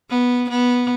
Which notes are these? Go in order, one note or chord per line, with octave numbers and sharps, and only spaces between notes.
B3
B3